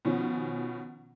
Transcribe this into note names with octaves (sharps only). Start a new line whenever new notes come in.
B2 D#3 F3 C#4